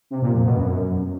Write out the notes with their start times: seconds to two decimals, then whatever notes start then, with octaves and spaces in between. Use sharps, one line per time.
0.11 C3
0.22 A#2
0.33 F2
0.45 B2
0.56 F#2